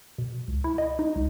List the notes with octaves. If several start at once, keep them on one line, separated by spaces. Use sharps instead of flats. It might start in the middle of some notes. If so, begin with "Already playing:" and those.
B2
C#2
E4
D#5
D#4
C#2